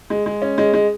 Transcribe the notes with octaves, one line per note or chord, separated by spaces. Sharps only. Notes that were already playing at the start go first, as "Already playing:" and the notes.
G#3
G#3
C#4
G#3
G#3